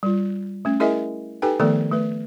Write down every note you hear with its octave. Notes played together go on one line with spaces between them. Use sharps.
G3 F4
A3 C#4
E4 G#4 A#4 D#5 E5 G#5
D#4 G4 A4 B4 G5 G#5
D#3 F3 A3 B3 A4 D5
A3 B4